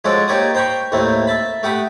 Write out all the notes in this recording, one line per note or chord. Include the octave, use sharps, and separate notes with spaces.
F3 G#3 C#4 F#4 A4 D5
A#3 D#4 G4 C#5 D5 D#6
C5 G5 A#5 B5 C#6
D#2 A2 A3 A#3 C4
E5 A5 B5
A3 G4 F#5 B5 D#6